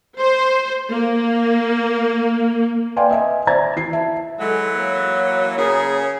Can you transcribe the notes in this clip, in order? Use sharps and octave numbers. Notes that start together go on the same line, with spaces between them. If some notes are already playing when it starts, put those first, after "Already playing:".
C5
A#3
B4 D5 F5 G5 G#5 C6
D#5 E5 G#5
C5 D5 E5 A#5 G#6 A6
E3 E4 C7
E5 A5
E3 F#3 G#3 A4
A#3 C#5
C#3 G#4 A#4